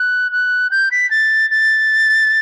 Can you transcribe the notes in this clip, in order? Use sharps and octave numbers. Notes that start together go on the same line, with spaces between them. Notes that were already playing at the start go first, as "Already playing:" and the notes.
Already playing: F#6
F#6
G6
B6
A6
A6